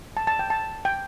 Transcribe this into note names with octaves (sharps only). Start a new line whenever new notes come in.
A5
A5
G5
A5
G5